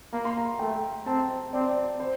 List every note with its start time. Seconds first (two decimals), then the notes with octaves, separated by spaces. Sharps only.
0.13 A#3 A#5
0.25 C6
0.38 A#5
0.59 A3 G5
1.06 C4 A5
1.53 C4 D5
1.61 C5
1.70 D5
2.00 C5